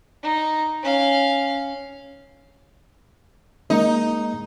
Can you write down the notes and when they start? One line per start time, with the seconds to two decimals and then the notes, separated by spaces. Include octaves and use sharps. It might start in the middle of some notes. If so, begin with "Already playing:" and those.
0.23 D#4
0.83 C#4 F5
3.70 G#3 A#3 D#4 D#5